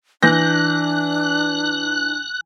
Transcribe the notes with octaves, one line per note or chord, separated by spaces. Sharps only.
E3 D4 F#6 G6 A#6